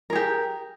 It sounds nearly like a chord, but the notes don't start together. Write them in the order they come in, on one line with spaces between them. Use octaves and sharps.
A#4 G#4 G4